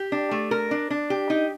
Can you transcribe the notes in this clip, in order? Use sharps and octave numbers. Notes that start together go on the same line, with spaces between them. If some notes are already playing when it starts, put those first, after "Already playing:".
Already playing: G4
D4
A3
A#4
D4
D4
G4
D#4